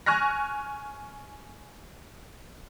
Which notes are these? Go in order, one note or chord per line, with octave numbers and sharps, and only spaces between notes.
G#5 C#6 F6 F#6 A#6